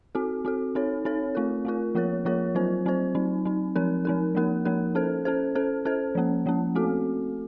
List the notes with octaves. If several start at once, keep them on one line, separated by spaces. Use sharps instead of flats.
C4 F#4 A4
C4 F#4 A4
C4 D#4 A4 C#5
C4 D#4 A4 C#5
A3 C4 F4 A#4
A3 C4 F4 A#4
F3 A#3 F4 A#4 C#5
F3 A#3 F4 A#4 C#5
F#3 C4 F4 C5
F#3 C4 F4 C5
F#3 C4 D#4
F#3 C4 D#4
F3 C4 D#4 A#4
F3 C4 D#4 A#4
F3 A#3 D#4 A#4
F3 A#3 D#4 A#4
C#4 A4 C5
C#4 A4 C5
C#4 A4 C5
C#4 A4 C5
F3 A#3 C#4
F3 A#3 C#4
A3 C4 F#4 A4